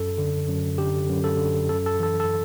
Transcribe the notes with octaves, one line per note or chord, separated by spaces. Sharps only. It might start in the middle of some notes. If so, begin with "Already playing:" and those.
Already playing: F#2 A4
D3
F#2
D3 G4
F#2
A4
D3
F#2 A4
A4
E3 A4
A4